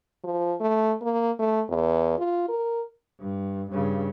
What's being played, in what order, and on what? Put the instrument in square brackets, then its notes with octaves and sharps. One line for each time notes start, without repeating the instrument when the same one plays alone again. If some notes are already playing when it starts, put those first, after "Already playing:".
[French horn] F3
A3
A#3
A3
E2
F4
A#4
[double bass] G2
G2 C#3